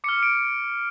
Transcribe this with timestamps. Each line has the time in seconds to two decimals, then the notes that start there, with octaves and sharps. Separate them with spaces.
0.04 D6 C#7
0.09 F6
0.23 D7